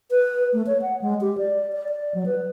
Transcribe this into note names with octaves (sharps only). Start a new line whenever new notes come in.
B4
A3
C#5
F#5
G#3
G4
D5
D5
D5
F#3
B4